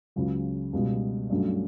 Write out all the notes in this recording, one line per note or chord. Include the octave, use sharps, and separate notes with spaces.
C#2 C#3 F#3
C#2 B2 G3
G2 F#3 A3 C#4